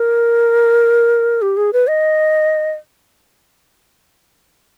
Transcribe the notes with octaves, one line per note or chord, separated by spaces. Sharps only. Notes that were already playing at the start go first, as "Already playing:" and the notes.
Already playing: A#4
G4
G#4
B4
D#5